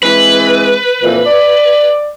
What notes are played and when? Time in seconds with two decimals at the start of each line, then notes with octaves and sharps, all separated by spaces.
0.03 E3 G#3 C4 B4
1.03 F2 A#2 E3
1.26 D5